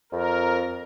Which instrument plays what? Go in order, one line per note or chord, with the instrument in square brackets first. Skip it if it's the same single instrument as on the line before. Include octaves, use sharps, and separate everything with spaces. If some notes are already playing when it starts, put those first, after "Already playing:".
[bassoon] F2 [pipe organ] A#4